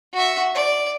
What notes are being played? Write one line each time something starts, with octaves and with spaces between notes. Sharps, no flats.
F#4 E5
D5